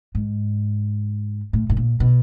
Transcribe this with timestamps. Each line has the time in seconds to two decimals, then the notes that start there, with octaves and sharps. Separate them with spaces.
0.15 G#2
1.53 A2
1.70 A2
1.77 A#2
2.00 B2